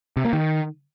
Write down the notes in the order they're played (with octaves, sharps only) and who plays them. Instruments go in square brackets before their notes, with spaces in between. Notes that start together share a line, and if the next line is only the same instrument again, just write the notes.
[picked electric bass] C3
A#3
D#3